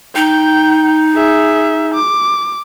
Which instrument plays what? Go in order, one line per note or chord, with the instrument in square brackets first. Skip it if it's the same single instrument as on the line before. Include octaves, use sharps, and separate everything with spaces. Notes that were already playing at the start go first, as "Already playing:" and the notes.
[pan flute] D#4 [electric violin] G5
[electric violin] G#4 E5
D6